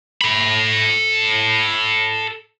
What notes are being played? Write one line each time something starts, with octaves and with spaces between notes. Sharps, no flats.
A4 B5